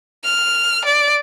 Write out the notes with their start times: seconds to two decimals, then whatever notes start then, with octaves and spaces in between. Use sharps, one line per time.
0.24 F6
0.85 D5